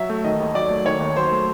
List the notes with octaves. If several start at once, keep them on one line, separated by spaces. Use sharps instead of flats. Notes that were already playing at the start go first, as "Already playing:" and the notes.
Already playing: F#3 E5
A3
D#3 D#5
D#2
F#3 D5
A3
D#3 C#5
D#2
F#3 C5
A3